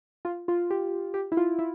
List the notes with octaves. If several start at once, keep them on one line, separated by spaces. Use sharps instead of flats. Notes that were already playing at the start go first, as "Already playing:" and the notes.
F4
F4
G4
G4
E4
F4
E4